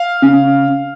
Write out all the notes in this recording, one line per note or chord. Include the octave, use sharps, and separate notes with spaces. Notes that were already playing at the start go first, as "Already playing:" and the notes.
Already playing: F5
C#3